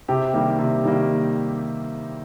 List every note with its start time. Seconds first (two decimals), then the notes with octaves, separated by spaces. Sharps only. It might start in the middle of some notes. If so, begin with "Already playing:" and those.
0.08 C3 G4
0.33 D#3 G3 A#3
0.59 C3
0.84 D#3 G3 A#3